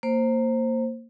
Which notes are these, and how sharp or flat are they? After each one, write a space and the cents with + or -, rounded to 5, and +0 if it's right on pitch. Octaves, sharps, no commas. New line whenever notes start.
A#3 -15 C5 +10